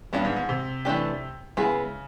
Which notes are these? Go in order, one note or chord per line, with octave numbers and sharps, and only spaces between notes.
G2 B3 D4 F4
G#2
G#2
C3
E3 A3 D4 G4
C#3 G#3 B3 E4 G#4